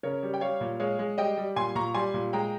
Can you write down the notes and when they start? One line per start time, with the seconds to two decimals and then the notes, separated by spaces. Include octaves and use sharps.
0.03 C#3 A#4 C#5
0.23 G3
0.34 G5
0.41 G3 C#5 F5
0.61 A#2
0.80 G#3 C#5 F5
0.99 G#3
1.18 G3 D#5 G5
1.37 G3
1.56 A#2 G#5 C6
1.75 A#2 A#5 C#6
1.94 G3 G#5 C6
2.14 A#2
2.33 G#3 G5 A#5